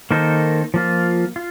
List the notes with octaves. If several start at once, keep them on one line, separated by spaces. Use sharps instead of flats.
D#3 A#3 D#4 A4 C5
F3 A#3 F4
F4